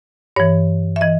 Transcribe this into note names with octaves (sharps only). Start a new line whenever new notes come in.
G2 E3 C#5
E5
E3 D#5